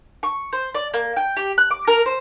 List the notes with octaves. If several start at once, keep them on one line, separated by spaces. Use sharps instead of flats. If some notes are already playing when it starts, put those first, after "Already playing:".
C#6
C5
D5
A#3
G5
G4
F#6
D6
A#4
C5